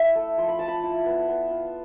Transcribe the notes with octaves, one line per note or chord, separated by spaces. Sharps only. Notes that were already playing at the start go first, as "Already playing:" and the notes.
Already playing: E4 E5
A3
F3 C6
B5
F3 A5
B5
E4
B3
B3
F4